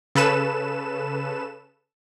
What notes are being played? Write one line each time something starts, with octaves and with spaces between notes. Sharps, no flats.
C#3 A4 B4 E7